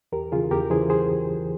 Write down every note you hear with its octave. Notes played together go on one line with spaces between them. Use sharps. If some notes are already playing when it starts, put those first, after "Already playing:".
E2 G4 A#4
C#3 E3 F4 G#4
E2 G4 A#4
C#3 E3 G#4 C5
G#4 C5